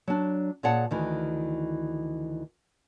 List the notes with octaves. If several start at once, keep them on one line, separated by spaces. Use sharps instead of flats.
F#3 D4
A#2 G#4 C#5 D5 F#5 A5
D2 D#3 E3